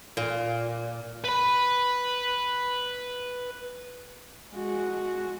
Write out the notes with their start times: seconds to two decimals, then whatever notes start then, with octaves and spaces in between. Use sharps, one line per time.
0.17 A#2
1.24 B4 B5
4.54 G#3 F#4